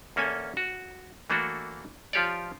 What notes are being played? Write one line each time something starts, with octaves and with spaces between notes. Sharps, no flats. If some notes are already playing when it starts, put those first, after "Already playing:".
E2 A#3 C#4 A4 G#5
F#4
E3 A3 A#3 D4 F#4 A4
F3 F4 G4 C#5 D5